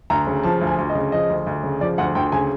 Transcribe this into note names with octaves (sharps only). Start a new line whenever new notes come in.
D2 A#5
C#3
F3 A5
D2
G#5
D2
D#5
C#3
F3 D#5
D2
D2
C#3
F3 D5
D2 F#5
D2 G5
C#3 G#5